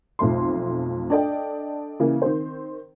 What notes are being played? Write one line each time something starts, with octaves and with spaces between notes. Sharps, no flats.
B1 F2 A3 C6
D4 A4 D5 D#5 G5
C#3 E3 A#3
D#3 C4 C5